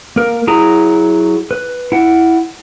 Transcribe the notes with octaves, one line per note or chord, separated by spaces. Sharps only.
A#3 A#4
F#3 E4 G#4 A#5
B4
E4 F#5